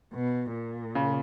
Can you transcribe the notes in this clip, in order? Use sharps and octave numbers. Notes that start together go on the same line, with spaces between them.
B2
A#2
C#3